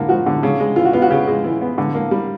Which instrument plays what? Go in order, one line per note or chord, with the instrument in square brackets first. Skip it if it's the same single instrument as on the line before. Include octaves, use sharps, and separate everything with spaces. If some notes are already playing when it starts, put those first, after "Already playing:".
Already playing: [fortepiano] D3 A#3
F3 F#4
D3
C#3
G#3
E3 F4
F#4
B3 F4
F#4
C#3 G4
G#3
E3
B3
D3
A#3
G3